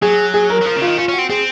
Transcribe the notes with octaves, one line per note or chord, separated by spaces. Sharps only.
F#3 G#4
G#4
A#4
F#3
F3 A#4
C#3
F4
D#3
C#4 F4
C#4 F#4
C4
C4 G#4